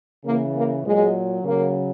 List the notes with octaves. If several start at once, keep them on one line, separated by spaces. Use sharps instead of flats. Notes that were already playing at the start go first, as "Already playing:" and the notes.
C#3 E3 A#3
A#3
A#2 F#3 G#3
C#3 F#3 A#3